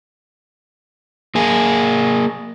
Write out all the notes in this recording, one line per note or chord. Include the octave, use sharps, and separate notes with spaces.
A#3 G#4